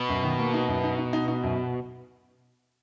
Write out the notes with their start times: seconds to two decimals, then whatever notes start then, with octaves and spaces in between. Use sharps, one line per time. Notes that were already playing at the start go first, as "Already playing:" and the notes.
Already playing: B2
0.09 F#2
0.24 D#3
0.39 A#3
0.54 D#4
0.68 F#2
0.84 D#4
0.98 D#4
1.13 D#4
1.28 D#4
1.43 F#2